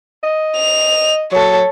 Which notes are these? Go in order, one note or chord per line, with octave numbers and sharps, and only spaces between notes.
D#5
F7
F#3 A4 C#5